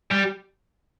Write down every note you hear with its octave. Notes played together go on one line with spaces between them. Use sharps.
G3